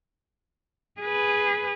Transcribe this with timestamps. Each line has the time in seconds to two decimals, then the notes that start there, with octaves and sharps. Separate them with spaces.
1.01 G#4 B4